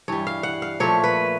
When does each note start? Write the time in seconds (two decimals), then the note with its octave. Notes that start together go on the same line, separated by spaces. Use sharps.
0.08 G2 E3 G3 C#5
0.27 F5
0.43 F#5
0.62 F5
0.80 A#2 F3 A3 C#5
1.04 B4